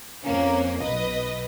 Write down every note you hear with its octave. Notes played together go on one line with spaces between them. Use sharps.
F2 A#3 C#4
B1 B4 D#5